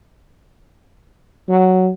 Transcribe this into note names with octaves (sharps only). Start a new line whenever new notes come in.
F#3